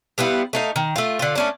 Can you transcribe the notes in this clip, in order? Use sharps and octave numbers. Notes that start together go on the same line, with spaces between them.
G3 B3 E4 F4
A3 D#4 F5
D#3
A3 F4
D3 F4
A3 C#4 D4